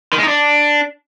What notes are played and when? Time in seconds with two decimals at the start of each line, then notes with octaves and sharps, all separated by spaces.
0.13 D#3
0.18 G#3
0.23 D#4
0.28 D4